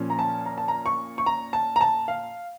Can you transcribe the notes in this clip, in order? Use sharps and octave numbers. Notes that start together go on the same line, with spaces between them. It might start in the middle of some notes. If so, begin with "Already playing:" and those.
Already playing: A#2 F3 C#4
A#5
A5
A#5
A5
A#5
C#6
C#6
A#5
A5
A#5
A5
F5